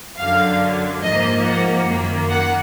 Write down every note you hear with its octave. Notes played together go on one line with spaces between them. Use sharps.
F#2 D3 F#3 F5
G#2 F3 A#3 D#5
F#5
F#2 D#3 A#3
F#5